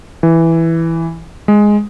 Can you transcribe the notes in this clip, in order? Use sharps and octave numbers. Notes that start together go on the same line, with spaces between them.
E3
G#3